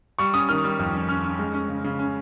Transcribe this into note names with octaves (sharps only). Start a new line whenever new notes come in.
G3 C#6
C#4 D#6
D#3 F6
G3
F2
C#4
C#4 F6
C#4
G#3
C#4
C#3
C#3
C#4